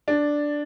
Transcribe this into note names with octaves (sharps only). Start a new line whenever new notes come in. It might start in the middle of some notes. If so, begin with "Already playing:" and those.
D4